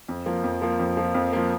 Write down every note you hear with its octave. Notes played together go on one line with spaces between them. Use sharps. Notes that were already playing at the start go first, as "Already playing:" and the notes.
F2
F3 A#3
F2
F3 A#3
F2
F3 A#3
F2
F3 A#3